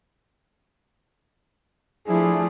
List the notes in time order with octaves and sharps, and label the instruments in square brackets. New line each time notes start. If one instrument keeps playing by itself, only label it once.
[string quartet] F3 [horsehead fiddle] A3 E4 [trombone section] D4 G#4